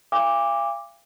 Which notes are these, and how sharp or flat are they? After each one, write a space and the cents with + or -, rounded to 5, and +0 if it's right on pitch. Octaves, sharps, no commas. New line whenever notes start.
F5 -35 G#5 -45 D6 +0